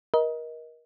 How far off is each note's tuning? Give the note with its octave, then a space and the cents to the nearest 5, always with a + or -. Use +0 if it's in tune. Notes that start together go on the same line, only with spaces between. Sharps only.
A#4 +30 D#5 +20